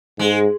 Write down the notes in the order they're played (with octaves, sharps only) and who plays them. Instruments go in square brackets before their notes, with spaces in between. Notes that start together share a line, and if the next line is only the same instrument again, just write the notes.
[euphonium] G#2 [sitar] G#3